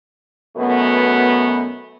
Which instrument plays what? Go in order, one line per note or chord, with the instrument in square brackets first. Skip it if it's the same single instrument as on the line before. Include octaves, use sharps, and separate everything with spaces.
[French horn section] F#2 B2 A3 B3